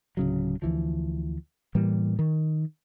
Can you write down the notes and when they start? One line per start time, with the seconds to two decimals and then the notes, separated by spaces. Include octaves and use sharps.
0.17 D1 C#3 F#3
0.62 D2 E3 F3
1.75 A2 E3 G3 A#3
2.19 D#3